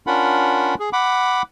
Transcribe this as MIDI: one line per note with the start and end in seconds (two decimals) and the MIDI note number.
0.07 0.75 61
0.07 0.75 62
0.07 0.75 65
0.07 0.75 70
0.07 0.75 78
0.07 0.75 83
0.80 0.90 68
0.93 1.42 78
0.93 1.42 83
0.93 1.42 86